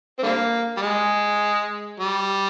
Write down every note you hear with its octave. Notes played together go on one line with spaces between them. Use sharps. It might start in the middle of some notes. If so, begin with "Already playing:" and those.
C4
D3 G3 A#3
G3
G#3
G3